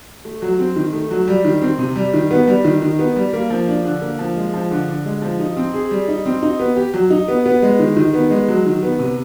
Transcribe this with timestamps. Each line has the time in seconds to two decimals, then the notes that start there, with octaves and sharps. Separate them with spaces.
0.25 A3
0.42 F#3
0.59 C4
0.76 D#3
0.93 A3
1.11 F#3
1.28 G3
1.45 D#3
1.62 C4
1.78 C3
1.96 G3
2.14 D#3
2.31 B3
2.47 G3
2.65 D#3
2.82 D#3
2.99 B3
3.16 G3
3.33 A#3
3.50 F3
3.68 D4
3.85 D3
4.02 A#3
4.19 F3
4.37 G#3
4.54 F3
4.71 D3
4.88 D3
5.05 G#3
5.22 F3
5.40 D#4
5.57 C4
5.73 G#4
5.91 G3
6.08 D#4
6.26 C4
6.42 D#4
6.59 B3
6.76 G4
6.94 F#3
7.10 D#4
7.28 B3
7.46 B3
7.62 G#3
7.79 D#3
7.97 D#3
8.13 B3
8.30 G#3
8.48 F#3
8.66 D#3
8.82 B3
8.99 C3